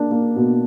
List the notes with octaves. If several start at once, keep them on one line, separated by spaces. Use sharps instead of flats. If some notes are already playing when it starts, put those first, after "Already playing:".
Already playing: A#3 D4
A#3
B2